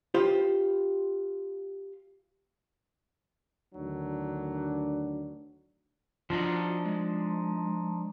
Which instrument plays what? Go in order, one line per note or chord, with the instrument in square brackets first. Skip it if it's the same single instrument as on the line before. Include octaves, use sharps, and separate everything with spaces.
[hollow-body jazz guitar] F4 G4 B4 C5
[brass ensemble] D2 D#3 F#3 D4
[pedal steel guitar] F3 D4 D#4 [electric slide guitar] F4 F#4 D#5
[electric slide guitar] G#3